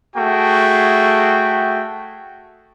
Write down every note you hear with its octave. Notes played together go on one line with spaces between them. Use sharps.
A3 F#4 G#4 G5